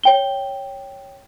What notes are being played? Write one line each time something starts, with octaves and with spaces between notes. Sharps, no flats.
C#5 G5 G7